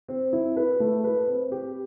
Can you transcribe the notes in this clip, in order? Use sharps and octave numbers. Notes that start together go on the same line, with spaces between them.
C4
E4
B4
A3
B4
C4
G4